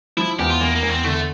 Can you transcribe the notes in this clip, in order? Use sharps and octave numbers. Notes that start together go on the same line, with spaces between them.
F3 E4
E2 G4
F4
E2 A#3
A#3
E2
C4
D3 A3